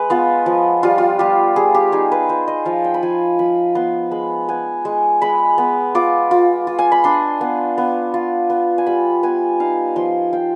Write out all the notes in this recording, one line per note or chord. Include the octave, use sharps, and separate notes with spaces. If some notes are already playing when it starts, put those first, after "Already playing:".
Already playing: G#3 B4
B3 F4
F3
G3 F4
F4
G3 G4
G3 G#4
G4
D#4 G#4
B4
F4 C5
D#5
F3 F5
G5
B5
F3 G#5
F3 B5
B3 C6
G#3 B5
B3 G#5
G#3
G#3 B5
B3
F4 D6
F4
F4
G#5
B5
D4 C6
B3
B3
F4
B3
G#5
G3 B5
B3 G#5
D#4 F5
F3 C6
F4 G5